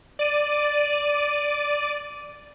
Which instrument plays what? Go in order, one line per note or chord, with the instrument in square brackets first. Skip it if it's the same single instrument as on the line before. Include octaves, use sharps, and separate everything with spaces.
[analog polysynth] D5 D#7